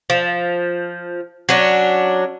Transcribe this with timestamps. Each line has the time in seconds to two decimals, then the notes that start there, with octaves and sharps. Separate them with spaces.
0.10 F3
1.49 F#3 C#4 D4